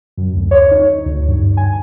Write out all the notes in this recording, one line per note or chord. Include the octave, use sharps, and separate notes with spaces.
F#2
D2
C#5
D#4
D2
G2
G#5